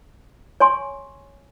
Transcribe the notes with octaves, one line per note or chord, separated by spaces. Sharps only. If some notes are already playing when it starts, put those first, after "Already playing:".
C#5 G#5 C6 C#6